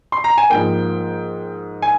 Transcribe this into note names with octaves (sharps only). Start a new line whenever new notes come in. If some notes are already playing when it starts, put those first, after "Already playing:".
C6
A#5
G#5
G#2 F3 A#3 G5
G#5